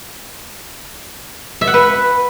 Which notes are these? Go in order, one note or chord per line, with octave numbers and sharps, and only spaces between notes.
E5
F#5
B4